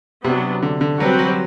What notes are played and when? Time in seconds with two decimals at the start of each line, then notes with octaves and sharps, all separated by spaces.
0.24 C3 F#3 B3 D4
0.63 D3
0.81 D3
1.00 F#3 G3 C4 F#4 B4
1.19 F#3